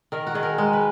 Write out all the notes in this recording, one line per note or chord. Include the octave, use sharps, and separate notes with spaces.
D#3 A#4
F#4
D#3 G#4
A#4
G#3
B4